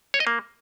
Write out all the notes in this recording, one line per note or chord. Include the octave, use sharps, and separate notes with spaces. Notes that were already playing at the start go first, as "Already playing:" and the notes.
C#5
D#5
A#3